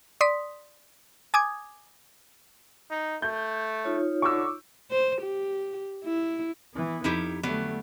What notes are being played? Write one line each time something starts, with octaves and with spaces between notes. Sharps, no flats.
D5 C6 D#6 B6
G#5 D6 D#6 G#6
D#4
A3 G6
D#4 F4 C#5
D3 C#6 D6 E6
C5
G4
E4
E3 B3
F2 D#4 E4 G4
D3 F#3 G3 A3 B3